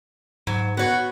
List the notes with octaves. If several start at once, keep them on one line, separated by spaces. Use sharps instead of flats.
G#2 F#3
B3 F#4 C#5